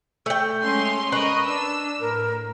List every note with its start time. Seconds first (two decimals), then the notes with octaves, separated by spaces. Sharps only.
0.26 A3 G5
0.63 G#3 C#4 C6
1.12 A#4 B4 D#5 C#6
1.46 D4 E6
2.00 A2 A#4